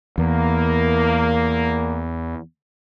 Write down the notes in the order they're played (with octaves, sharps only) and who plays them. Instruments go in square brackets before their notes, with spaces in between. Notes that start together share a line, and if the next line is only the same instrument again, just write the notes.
[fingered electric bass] E2 [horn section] A#3